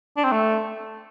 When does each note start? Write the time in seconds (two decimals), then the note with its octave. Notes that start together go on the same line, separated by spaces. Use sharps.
0.17 D4
0.24 C4
0.32 A3